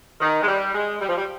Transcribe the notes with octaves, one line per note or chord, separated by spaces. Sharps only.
D#3
G#3
G3
G#3
G3
F3
G3